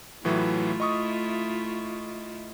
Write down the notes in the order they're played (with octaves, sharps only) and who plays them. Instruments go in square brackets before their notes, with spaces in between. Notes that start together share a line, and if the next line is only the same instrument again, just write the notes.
[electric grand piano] A2 E3 F#3 [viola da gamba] A3 E4 F4
[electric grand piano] D#5 C#6 D#6